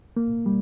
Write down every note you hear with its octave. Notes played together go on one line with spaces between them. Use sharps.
A#3
G3